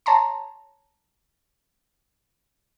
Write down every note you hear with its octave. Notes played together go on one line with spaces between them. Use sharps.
C#5 A5 A#5 C6